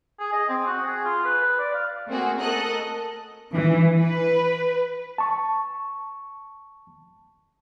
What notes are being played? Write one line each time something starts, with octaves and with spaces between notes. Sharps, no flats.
G#4
D#5
C4
F#4
G#4
F4
B4
B4
D5
F5
A3 A#3 C4 F#4 G#4
A4 A#4 D#5 F#6
E3
B4
A5 C#6